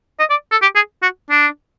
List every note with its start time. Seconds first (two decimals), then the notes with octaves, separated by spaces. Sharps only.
0.19 D#5
0.30 D5
0.52 A4
0.62 G4
0.75 G#4
1.02 F#4
1.30 D4